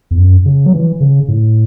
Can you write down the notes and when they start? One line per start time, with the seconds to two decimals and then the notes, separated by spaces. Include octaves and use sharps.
0.11 E2
0.17 F#2
0.45 C#3
0.66 F#3
0.73 E3
1.00 C#3
1.28 A2